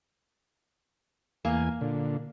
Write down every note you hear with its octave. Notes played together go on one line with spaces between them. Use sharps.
E2 A#3 G#5
A#2 D3